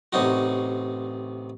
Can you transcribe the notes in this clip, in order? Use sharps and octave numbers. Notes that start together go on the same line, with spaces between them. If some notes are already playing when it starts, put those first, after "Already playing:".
A1 C3 D#4 F#4